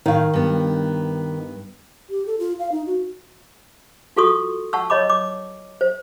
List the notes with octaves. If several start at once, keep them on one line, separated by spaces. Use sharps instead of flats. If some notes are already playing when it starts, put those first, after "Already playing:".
A2 D#3 F5
G2 B3
G4
A4
F4
F5
D#4
F#4
F4 F#4 A4 C6 C#6 D#6
F#5 A5 C#6 E6
C#5 D#5 B5 D6
D6
C5